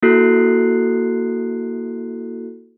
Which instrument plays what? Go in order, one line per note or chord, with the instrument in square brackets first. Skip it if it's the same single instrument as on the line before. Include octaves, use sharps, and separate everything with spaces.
[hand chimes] A#3 E4 F#4 A4 F#6 C7